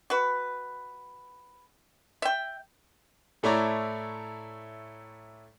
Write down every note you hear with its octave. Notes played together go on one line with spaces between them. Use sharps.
F#4 B4
E5 G5
A2 A3 E4 C#5 D5 A#5